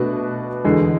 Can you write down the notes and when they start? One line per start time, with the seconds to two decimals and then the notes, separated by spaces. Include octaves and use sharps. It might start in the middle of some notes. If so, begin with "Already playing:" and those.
Already playing: B2 A3 D4 F#4 B4
0.65 E2 D3 G#3